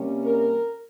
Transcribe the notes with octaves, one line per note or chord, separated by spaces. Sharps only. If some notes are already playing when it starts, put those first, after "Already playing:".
Already playing: C3 G3 A#3 C#4
A#4